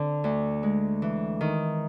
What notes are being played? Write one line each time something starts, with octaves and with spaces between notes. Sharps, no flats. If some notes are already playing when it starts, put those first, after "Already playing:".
Already playing: D3 C4
D2
G#3
E3
D#3